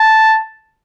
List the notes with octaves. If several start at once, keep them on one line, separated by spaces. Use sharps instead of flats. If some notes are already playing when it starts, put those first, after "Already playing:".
Already playing: A5